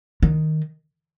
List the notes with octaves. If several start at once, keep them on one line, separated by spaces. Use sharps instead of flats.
D#3